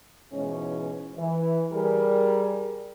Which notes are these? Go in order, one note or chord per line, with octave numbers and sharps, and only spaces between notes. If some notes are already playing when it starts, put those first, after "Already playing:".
G#2 B2 E3 G#3 C#4
E3
G3 G#4 A#4